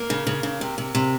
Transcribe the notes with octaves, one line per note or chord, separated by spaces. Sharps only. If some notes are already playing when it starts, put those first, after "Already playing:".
Already playing: A#3
C#3
C#3
C#3
C3
C3
C3